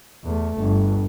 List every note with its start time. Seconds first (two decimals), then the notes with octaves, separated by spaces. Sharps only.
0.24 E2 A3
0.59 G1